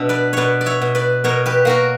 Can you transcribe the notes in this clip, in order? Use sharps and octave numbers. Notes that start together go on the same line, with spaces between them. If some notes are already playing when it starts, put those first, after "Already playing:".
Already playing: B2 D4 E5
B4 D5
B2 B4 C#5 D5
D5
C#5 E5
B2
B4 D5
B2 A#4 C#5
G4 B4
A#3 F#4 A#4